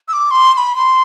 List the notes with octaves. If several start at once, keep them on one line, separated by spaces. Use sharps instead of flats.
E6
D6
C6
C6
B5
C6